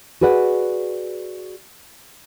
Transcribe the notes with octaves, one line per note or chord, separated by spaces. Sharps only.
F#4 G#4 B4 D5 F#5